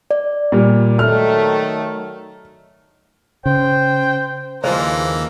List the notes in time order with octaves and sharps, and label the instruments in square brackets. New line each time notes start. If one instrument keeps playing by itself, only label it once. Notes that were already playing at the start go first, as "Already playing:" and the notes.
[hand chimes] D5
[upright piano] A#2 G3
[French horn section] D#3 F#3 A3 [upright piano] F6
[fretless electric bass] C#3 [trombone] C5 [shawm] G5
[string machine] D#2 [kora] C#3 F3 G#3 [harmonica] E3 A#3 [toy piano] C5